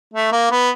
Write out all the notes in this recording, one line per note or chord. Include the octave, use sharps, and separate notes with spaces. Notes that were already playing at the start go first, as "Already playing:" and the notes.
A3
A#3
B3